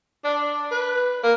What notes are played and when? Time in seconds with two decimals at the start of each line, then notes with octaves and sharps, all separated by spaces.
0.24 D4
0.71 B4
1.24 A#3